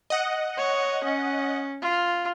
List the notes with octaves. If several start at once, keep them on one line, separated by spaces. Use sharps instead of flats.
D#5 F#5
C#5
C#4
F4